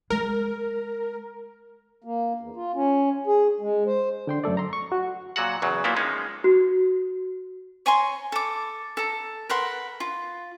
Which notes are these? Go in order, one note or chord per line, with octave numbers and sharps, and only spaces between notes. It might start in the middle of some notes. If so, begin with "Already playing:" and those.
G#3 C4 A#4
A#3
E2
F4
C#4
G#4
G#3
C5
D3 G5 C6
F#2 A3 A4 D5
A#5 C6
C#6
F#4
A#2 F#3 F#4 F#5
E2 C#3 F#3
A#2 F#3 A#3 B3 E4
F3 G#3 A#3 C#4 D#4
F#4
C#5 G#5 A#5 C6
A4 D6
A4 A#5
A#4 B4 F#5 C6
F4